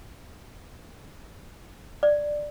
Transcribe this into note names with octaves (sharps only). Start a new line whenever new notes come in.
D5